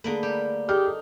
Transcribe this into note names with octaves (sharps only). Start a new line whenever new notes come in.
D3 A3 A#3 G#4 A#4 B4
G3 G4
D#4 G4 G#4 F6
A4